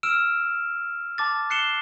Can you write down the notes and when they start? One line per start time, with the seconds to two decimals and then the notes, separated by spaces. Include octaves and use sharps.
0.03 E6 F6 D7 E7
1.18 A5 D6 A6
1.50 F#6 C7 C#7 E7 G7